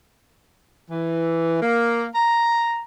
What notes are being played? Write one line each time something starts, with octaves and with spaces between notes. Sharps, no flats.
E3
A#3
A#5